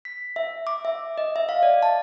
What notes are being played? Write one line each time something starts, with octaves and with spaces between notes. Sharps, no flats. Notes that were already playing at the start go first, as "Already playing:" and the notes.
B6
E5
D6
E5
D#5
E5
F5
D5
A5